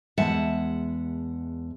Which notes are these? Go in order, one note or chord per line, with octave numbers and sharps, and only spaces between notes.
E2 G#3 E5 F#5 A5